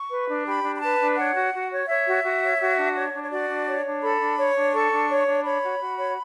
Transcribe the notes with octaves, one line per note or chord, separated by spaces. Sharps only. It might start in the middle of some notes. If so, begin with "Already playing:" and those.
Already playing: C#6
B4
D4
G4 B5
D4
B5
B4 A5
D4
C#5 F#5
F#4
F#4
C#5
C#5 E5
F#4
F#4
C#5
F#4
D4
C#5
D4
C#5
F#4 D5
D4
C#5
D4
A4 B5
D4
C#5
D4
A4 C#6
D4
C#5
D4
C#5 B5
F#4
F#4
C#5